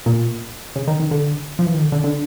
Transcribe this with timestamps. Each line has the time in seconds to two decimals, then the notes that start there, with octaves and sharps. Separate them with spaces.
0.06 A#2
0.76 C#3
0.87 D#3
1.00 D#3
1.11 D3
1.59 F3
1.67 E3
1.74 D#3
1.81 D3
1.92 D3
2.04 D3